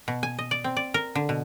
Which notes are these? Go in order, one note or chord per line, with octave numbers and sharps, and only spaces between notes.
B2
G#5
D#5
D5
C4
D5
A#4
D3
B2